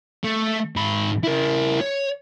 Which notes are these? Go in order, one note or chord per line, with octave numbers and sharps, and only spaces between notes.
A3
G#2 B5
E4 A#4
C#5